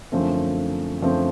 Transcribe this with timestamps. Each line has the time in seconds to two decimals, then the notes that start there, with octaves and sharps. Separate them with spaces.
0.12 F#2 D3 F3 A3 C4
1.02 F#2 D3 F3 A3 C4